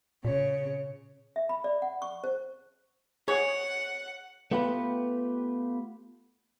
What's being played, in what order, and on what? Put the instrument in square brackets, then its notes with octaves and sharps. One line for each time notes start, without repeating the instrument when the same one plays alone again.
[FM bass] A#2 [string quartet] C#3 C#5
[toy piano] E5
B5
D5
F#5
C#6
C5
[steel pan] G#4 [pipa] C#5 [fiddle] F#5
[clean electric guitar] A3 B3 F4 G4 B4